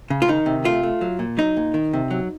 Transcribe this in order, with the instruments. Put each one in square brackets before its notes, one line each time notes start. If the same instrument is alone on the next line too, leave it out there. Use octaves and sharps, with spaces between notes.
[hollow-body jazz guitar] C#3
F4
D#3 D#4
C3
A3 F4
A3
F#3
A#2
F#3 D#4
A#2
D#3
C3
F#3